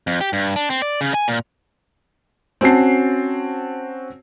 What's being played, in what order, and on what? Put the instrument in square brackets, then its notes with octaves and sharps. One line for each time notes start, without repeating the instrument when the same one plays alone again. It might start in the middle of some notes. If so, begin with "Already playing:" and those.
[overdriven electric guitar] F2
G4
G2
D4
C4
D5
C#3
G#5
A#2
[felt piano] C4 C#4 F#4 A5 C7